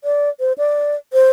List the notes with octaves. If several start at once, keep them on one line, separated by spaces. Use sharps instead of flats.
D5
C5
D5
C5